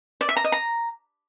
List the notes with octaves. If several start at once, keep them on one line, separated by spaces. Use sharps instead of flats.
D5
E5
A#5
D#5
A#5